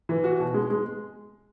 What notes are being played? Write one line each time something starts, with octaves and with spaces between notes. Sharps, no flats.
E3
F#4
B2
G#3
G#3